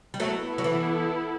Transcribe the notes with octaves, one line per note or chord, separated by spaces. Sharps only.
G3
F#3 A3 B3 E4 A4
F#3
E3